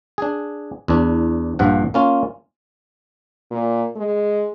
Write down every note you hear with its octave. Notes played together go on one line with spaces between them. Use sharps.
D4 G#4
E2 D4
A#1 G2 F3 F#5
A#3 C#4 F4
A#2
G#3